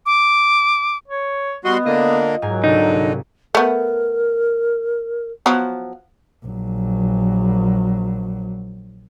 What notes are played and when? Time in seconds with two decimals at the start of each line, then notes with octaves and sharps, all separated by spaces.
0.06 D6
1.08 C#5
1.65 G3 B3 F#4 D#5 C6
1.85 D3 A#3 F4 D#5
2.42 G#2 F#3 A#4 G#5
2.64 C2 D3 D#4
3.55 A3 B3 A#4
5.46 F3 F#3 B3
6.45 A#1 F#3